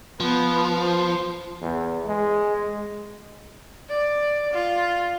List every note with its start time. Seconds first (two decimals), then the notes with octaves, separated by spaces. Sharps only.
0.20 F3 B3
0.81 C5
1.61 E2
2.06 G#3
3.89 D5
4.54 F4